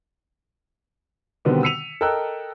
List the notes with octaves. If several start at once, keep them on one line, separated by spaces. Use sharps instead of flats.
B2 D3 D#3 G3 B3 C4
E6 B6 C#7 D#7 F7
A4 A#4 D#5 G5 E6 F#6